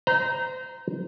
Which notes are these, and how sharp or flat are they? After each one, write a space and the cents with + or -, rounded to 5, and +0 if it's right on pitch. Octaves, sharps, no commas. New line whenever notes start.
C5 -30 A#5 +5